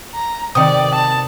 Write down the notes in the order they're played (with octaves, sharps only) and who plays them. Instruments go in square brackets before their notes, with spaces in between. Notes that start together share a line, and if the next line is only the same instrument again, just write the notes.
[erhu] A#5
[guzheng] C3 D#3 [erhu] D5 [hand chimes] G5 D#6
[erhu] A5